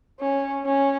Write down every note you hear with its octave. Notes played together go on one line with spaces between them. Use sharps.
C#4
C#4